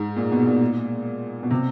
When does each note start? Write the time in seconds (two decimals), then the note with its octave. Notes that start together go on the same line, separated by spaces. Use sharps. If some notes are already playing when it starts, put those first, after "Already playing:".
Already playing: G#2
0.16 A#2
0.32 B2
0.46 A#2
1.43 B2
1.50 C3